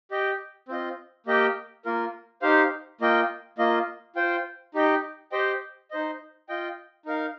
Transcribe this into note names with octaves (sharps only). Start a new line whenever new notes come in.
G4 D#5 G5
C4 F4 D#5
A#3 G4 D#5 G5
A#3 F4 A#4
D#4 G4 C5 F5
A#3 F4 D#5 G5
A#3 F4 D#5
F4 C5 G5
D#4 G4 D#5 G5
G4 C5 D#5 G5
D#4 C5 D#5
F4 D#5 G5
D#4 A#4 F5